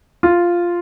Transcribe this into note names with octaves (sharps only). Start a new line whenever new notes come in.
F4